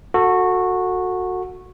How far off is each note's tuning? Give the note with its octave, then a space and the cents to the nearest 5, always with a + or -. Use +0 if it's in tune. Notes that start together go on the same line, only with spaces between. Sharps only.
F#4 -15 A4 +20